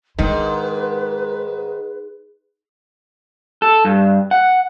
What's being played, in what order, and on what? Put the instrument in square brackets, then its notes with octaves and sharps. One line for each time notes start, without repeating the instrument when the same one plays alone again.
[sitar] G#2 [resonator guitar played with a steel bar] D#3 [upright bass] G#3 D4 [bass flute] B4
[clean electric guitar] A4
G2
F#5